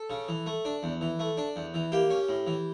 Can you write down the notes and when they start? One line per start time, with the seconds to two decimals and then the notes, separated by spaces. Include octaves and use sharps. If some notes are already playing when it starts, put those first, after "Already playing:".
Already playing: A4
0.10 C#3
0.28 E3
0.46 A3
0.65 D4
0.83 E2
1.01 E3
1.19 A3
1.37 D4
1.56 E2
1.74 E3
1.92 A#3 G4
2.10 C#4
2.29 A2
2.47 E3